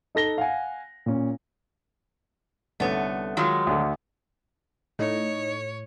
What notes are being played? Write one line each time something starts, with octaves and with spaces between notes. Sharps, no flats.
D#4 A4 A#6 G7
F5 F#5 G#5
A#2 C#4
C2 D3 A3 B3 C#4
D#3 F#3 G#3 F4
D2 D3
A2 D#4 C#5